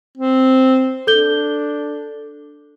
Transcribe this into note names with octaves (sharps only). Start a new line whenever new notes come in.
C4
D4 A4 G6 G7